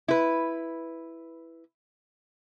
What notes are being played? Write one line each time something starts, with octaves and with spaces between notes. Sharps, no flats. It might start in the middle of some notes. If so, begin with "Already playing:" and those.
E4 B4